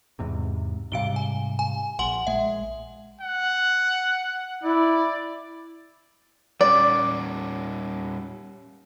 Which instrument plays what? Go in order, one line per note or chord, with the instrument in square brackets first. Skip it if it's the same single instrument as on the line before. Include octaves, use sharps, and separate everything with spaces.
[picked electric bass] E2 G#2 C3
[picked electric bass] G#2 C3 G3 [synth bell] F5 D7 G7
[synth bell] G#5
G#5
[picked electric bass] A#1 [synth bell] F#5 C6 F#7
[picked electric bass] A#1 G#3 [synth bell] E5
[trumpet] F#5
[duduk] E4 [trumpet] D5
[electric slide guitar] G3 C#4 [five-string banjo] D5